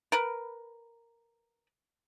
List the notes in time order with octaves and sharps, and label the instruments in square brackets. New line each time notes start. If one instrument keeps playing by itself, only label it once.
[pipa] A#4 B4